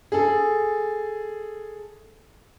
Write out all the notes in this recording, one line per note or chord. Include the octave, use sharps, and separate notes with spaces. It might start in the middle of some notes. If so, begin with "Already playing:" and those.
G#4 A4